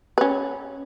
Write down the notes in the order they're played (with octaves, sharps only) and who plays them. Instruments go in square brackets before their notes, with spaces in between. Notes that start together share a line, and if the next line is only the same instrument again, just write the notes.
[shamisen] C#4 B4